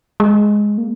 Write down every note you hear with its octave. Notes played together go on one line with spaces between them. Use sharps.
G#3
A#3